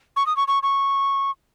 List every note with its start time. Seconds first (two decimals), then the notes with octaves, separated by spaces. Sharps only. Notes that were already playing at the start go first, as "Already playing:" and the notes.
0.16 C#6
0.26 D#6
0.37 C#6
0.48 C#6
0.63 C#6